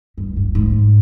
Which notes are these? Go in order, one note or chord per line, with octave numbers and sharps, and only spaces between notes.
G2
G2
G#2